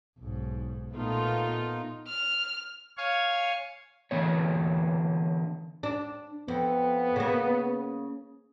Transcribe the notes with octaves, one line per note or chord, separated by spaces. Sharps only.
B1 G#2
A#2 A3 B3 D#4 F4
F6
C#5 F5 G#5 C#6
D3 E3 B3 C#5
D4
F2 B3
C#3 A#3